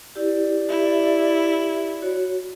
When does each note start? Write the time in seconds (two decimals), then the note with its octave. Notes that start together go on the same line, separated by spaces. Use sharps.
0.16 E4 G4 D5
0.69 E4 G4 E5
2.02 F#4 C#5